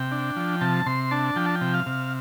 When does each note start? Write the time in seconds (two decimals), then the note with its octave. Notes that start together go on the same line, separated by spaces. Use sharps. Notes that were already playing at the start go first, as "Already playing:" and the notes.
Already playing: C3 G5
0.12 D4
0.36 F3
0.61 C3 A5
0.86 C3 C6
1.11 D4 A5
1.36 F3 G5
1.46 A5
1.55 G5
1.61 C3
1.74 F5
1.86 C3